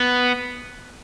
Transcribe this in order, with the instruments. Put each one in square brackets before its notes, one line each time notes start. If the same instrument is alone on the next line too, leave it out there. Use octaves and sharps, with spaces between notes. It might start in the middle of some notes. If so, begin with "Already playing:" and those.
Already playing: [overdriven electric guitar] B3